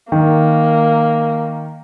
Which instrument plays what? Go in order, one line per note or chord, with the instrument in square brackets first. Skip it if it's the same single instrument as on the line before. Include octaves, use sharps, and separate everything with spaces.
[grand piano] D#3 [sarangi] A#3